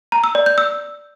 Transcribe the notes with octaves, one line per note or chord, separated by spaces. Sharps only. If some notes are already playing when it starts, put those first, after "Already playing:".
A#5
E6
D5
G6
E6